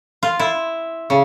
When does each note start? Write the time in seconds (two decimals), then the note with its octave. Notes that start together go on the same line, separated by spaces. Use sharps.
0.23 F4
0.39 E4
1.10 C#3